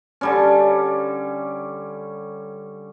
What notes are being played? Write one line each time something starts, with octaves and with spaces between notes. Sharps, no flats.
D3 G3 C#4